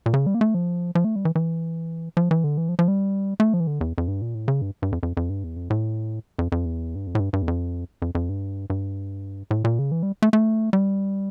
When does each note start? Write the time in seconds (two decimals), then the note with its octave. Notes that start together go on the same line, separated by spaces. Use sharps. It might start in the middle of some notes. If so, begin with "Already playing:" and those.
0.06 A#2
0.14 C#3
0.26 G3
0.35 A#3
0.41 A3
0.54 F3
0.95 F3
1.04 A3
1.16 G3
1.25 E3
1.35 E3
2.17 F3
2.31 E3
2.44 D3
2.57 E3
2.69 F3
2.79 F3
2.88 G3
3.40 A3
3.54 F3
3.60 E3
3.67 D3
3.81 E2
3.98 F2
4.08 G2
4.21 A#2
4.35 A2
4.48 C#3
4.62 G2
4.82 G2
4.92 F2
5.03 F2
5.17 F2
5.29 G2
5.44 E2
5.56 F2
5.70 A2
6.39 F2
6.52 F2
6.66 E2
6.95 G2
7.07 F2
7.15 A2
7.20 G2
7.33 G2
7.42 E2
7.48 F2
8.02 F2
8.15 F2
8.29 G2
8.70 G2
9.51 A2
9.64 A#2
9.79 C#3
9.92 E3
10.03 G3
10.22 A3
10.33 A3
10.73 G3